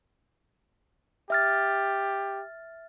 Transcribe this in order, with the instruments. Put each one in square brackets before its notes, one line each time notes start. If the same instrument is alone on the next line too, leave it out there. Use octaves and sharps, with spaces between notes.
[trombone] G4 [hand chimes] E5 F6 A6